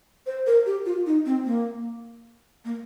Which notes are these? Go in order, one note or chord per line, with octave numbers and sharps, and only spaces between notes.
C5
A#4
G4
F4
D#4
C4
A#3
A#3